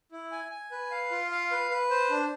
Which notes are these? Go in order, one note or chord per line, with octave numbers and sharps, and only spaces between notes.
E4
G#5
G#5
B4
F5
F4
F5
B4
B4
C5
D4